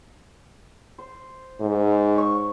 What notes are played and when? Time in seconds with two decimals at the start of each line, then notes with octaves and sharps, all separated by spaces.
0.98 C5
1.61 G#2
2.16 C#5 C#6